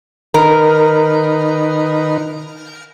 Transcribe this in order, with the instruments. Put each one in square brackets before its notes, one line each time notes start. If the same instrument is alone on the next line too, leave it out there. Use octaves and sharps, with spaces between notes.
[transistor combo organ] D#3 D#4 B4 [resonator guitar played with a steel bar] A#4